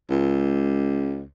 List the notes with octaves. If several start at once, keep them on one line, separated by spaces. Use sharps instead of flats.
C#2